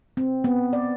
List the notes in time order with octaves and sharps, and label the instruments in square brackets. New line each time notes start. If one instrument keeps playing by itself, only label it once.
[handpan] C4
B3
D5